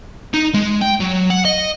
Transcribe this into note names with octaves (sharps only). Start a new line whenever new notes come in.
D#4
G#3
G5
F#3
F#5
D#5